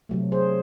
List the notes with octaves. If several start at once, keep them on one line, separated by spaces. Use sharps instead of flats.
C3 F#3 A3
G#4 C5